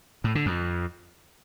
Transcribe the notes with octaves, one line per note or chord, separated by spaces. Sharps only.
A2
D3
F2